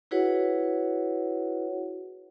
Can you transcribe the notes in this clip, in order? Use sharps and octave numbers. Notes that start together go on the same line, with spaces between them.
E4 F#4 G#4 B4 C#5 F#5